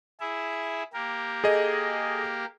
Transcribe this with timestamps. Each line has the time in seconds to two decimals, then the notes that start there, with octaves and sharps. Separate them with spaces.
0.20 E4 G#4 E5
0.93 A#3 G4 A#4
1.44 G#4 A4 D#5